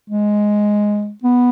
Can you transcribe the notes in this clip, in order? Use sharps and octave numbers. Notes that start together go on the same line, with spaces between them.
G#3
B3